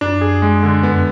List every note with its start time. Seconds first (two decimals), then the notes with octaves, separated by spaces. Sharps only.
0.01 F#2 D4
0.21 G#4
0.42 G#3
0.63 D3
0.83 F2 B3